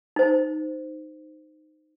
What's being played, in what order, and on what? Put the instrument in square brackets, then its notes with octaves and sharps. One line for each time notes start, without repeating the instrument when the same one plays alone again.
[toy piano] D#4 C5